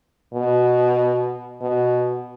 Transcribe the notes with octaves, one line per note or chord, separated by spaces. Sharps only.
B2
B2